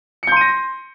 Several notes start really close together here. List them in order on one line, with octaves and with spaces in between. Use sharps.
C#7 G6 C6 D#7 A#6